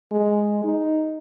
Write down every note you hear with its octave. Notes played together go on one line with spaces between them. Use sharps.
G#3
D#4